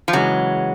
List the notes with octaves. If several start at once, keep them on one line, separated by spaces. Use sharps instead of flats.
F3
C#3 E3 F#3 G#3 C#4